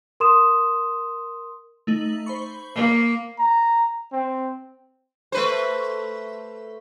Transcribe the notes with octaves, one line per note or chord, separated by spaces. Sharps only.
A#4 C6 D#6 E7
A3 D#4 F#7
C5 B5 C#6
A#3
A#5
C4
A3 B4 C5